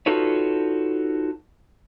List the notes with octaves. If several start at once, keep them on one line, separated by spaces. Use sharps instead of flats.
D#4 F4 F#4 A4 B4 C#5